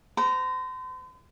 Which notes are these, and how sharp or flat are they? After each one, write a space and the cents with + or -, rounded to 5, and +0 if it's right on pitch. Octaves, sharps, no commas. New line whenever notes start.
C5 -40 A#5 +0